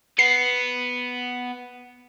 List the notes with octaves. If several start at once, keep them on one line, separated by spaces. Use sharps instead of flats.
B3 C7